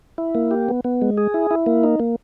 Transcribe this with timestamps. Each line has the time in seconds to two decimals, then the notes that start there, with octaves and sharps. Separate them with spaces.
0.18 E4
0.35 A#3
0.51 G4
0.69 B3
0.84 B3
1.02 G#3
1.18 G#4
1.34 E4
1.51 E4
1.66 A#3
1.84 D#4
2.00 A#3